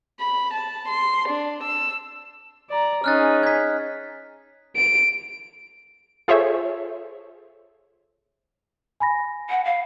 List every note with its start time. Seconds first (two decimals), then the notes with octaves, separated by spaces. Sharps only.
0.20 B5
0.53 A5
0.88 C6
1.29 D4
1.63 E6
2.70 D5 A#5
3.04 C#4 D#4 G#4 F6 F#6 A6
3.43 D#4 G#6 B6
4.77 D7
6.28 F4 G#4 A4 C5 C#5 E5
9.00 G#5 B5 A#6
9.50 F#5
9.65 F5